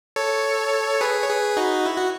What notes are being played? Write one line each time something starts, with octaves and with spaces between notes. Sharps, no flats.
A4 C#5
G#4 B4
C#5
G#4 B4
D#4 F#4
E4
F#4